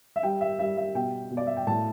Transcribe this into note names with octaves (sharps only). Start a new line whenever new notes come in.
E5
G3 G5
E5
G3 E5
E5
B2 G5
B2
D5
E5
G5
A2 A5